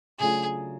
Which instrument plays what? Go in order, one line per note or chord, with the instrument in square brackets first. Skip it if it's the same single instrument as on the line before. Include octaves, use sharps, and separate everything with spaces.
[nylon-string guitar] C#3 F#3 A3 D4 F4 [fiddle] G#4